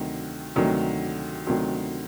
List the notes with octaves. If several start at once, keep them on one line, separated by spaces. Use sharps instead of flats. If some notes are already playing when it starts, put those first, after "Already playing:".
Already playing: D2 C3 D#3 F#3
D2 C3 D#3 F#3
D2 C3 D#3 F#3